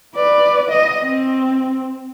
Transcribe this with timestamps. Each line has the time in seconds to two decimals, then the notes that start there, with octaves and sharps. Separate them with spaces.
0.16 B4 D5
0.70 D#5
1.02 C4